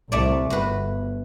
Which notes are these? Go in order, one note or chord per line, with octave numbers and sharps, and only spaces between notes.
C2 A3 D5
G1 F#4 B4